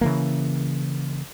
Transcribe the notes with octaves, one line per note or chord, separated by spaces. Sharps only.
C#3 E3 A#3